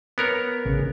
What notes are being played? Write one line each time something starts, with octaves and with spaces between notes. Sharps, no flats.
B3 A#4 C#5
A1 C#3